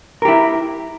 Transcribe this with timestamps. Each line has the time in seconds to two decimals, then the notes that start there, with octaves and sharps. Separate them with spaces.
0.22 A#4
0.25 G4
0.28 E4